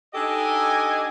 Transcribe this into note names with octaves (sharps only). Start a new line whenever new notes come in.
D4 D#4 G4 A4 D#5 G#5